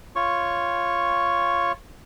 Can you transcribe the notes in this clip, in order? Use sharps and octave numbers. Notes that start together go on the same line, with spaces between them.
F4 C#5 C#6